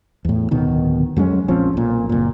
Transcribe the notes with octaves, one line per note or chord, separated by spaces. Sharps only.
E2 A2
D1 B2 D#3
F2 F#3 G#3 C#4
A#1 F3 C4 C#4
B1 A#2
F#1 A#2